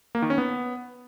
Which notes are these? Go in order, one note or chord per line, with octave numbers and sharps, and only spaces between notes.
A#3
D#3
C#4
B3